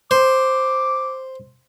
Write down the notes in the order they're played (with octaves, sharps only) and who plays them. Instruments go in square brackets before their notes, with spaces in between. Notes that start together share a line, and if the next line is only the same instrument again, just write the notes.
[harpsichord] C5 [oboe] D6